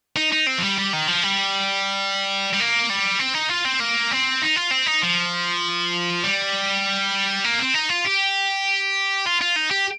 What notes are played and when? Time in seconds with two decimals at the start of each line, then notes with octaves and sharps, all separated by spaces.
0.17 D#4
0.33 D#4
0.47 C4
0.58 F3
0.62 G3
0.78 G3
0.93 D#3
1.08 F3
1.24 G3
2.53 G3
2.60 A#3
2.89 G3
3.20 C4
3.35 D#4
3.50 F4
3.65 C4
3.80 A#3
4.11 C4
4.42 D#4
4.56 F4
4.71 C4
4.86 D#4
5.02 F3
6.23 G3
7.44 A#3
7.59 C4
7.74 D#4
7.89 F4
8.05 G4
9.26 F4
9.42 F4
9.56 D#4
9.71 G4